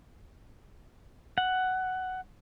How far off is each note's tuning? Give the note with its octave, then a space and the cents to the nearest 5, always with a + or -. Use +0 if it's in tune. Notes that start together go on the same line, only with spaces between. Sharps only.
F#5 +10